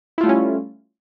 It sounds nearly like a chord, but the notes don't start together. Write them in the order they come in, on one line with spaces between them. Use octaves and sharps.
E4 F4 A3 G3 C#4